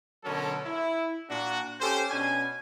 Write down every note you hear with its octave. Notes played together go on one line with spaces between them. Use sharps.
B2 D3 F#3 C#4 A4 A#4
E4
A#2 D4 F#4
C#4 G4 A4 C5
B2 C#4 D4 G#5